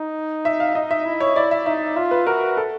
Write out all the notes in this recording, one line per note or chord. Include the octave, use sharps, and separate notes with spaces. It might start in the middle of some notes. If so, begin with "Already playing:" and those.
Already playing: D#4
E5
F5
D#4 D#5
E5
E4
C#5
E4 D5
E5
D#4 E5
F4 E5
B4
F#4 A#4
A4